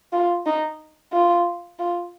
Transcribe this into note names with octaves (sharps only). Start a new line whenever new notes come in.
F4
D#4
F4
F4